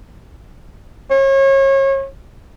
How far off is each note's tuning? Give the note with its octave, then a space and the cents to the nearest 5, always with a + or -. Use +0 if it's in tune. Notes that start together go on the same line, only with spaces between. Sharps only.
C#5 -35